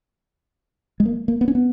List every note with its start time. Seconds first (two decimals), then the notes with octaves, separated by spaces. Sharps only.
1.00 G#3
1.06 A#3
1.28 A#3
1.41 B3
1.48 C#4
1.55 B3